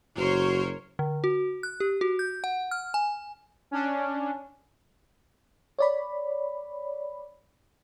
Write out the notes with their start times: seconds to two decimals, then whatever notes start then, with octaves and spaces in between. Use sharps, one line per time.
0.17 F#1 F#4 A#4 C5 C#5
0.99 D3
1.24 F#4
1.63 F#6
1.80 G4
2.01 F#4
2.19 G6
2.44 F#5
2.71 F6
2.94 G#5
3.71 C#4 D4
5.79 C#5 D5 B5